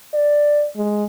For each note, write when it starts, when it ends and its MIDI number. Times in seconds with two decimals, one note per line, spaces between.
0.14 0.67 74
0.76 1.04 56